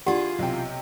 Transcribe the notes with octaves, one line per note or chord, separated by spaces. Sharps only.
E3 D4 F4 G4 G#4 F#5
B1 C3 G5